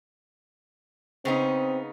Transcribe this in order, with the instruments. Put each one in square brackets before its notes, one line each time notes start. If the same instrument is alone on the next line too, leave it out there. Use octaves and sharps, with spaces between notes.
[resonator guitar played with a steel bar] C#3 B3 D#4 [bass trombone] C4